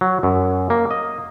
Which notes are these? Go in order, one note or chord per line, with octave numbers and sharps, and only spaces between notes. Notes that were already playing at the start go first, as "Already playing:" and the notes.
F#3
F#2
A#3
D#5